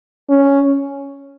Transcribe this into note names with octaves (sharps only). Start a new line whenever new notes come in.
C#4